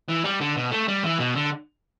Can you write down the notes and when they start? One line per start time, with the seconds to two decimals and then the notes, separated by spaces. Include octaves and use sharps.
0.09 E3
0.24 G3
0.40 D3
0.57 B2
0.71 A3
0.88 G3
1.04 E3
1.19 B2
1.35 D3